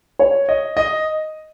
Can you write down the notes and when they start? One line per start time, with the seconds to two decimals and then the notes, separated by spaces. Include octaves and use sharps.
0.19 C#5
0.49 D#5
0.77 D#5